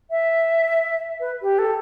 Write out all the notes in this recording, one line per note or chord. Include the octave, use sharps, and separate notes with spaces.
E5
B4
G4
A4